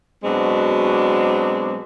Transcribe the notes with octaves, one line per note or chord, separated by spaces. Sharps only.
B2 F#3 G#3 C4 D4